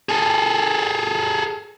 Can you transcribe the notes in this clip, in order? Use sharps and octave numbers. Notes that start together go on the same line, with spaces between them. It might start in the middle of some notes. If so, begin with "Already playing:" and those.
G#4 A4